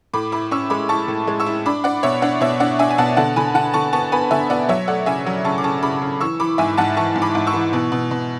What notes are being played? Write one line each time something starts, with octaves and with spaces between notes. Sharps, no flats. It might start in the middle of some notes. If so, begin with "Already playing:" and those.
A2 B5 D6
E4 B5 D6
C#4 C#6 E6
G#3 B5 D6
E4 A5 C#6
A2
G#3
C#6 E6
E4
D4 B5 D6
D4 D5 F#5
B2 C#5 E5
D4 D5 F#5
B2 C#5 E5
D4 D5 F#5
D4 E5 G#5
G#5
B2 F#5 A5
D3 F#5 A5
D3 G#5 B5
D3 F#5 A5
D3 A5 C#6
B3 A5 C#6
B3 G#5 B5
D3 E5 G#5
B3 D5 F#5
F#3 C#5 E5
A3 D5 F#5
C#3 E5 G#5
F#3
C#3 A5 C#6
D6
C#3 A5 C#6
C#3 B5 D6
C#3
E3 C#6 E6
E3 B5 D6
G#2 E5 G#5
G#2 F#5 A5
E3 A5 C#6
G#2
B5 D6
G#2
C#6 E6
E3
B2
B2
B2